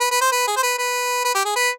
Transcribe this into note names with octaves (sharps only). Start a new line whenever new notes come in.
B4
B4
C5
B4
G#4
C5
B4
B4
B4
G4
G#4
B4